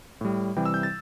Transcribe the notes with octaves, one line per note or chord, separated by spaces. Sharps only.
A2 G3
C3 E3 G3 G5
E6
G6
A6